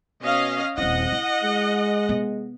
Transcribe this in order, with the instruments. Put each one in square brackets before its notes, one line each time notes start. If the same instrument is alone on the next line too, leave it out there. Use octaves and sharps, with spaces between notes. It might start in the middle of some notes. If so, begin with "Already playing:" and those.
[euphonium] B2 [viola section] C#4 D#5 F5
[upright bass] D#1 E4 [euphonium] C4 [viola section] D#5 F#5
[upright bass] E4
[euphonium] G#3
[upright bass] C3 B3